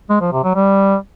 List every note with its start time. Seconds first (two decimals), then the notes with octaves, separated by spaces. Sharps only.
0.10 G#3
0.21 F3
0.32 C3
0.44 F#3
0.55 G3